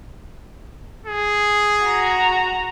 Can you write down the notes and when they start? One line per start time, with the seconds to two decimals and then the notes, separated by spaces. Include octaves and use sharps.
1.06 G#4
1.84 F#4 A#5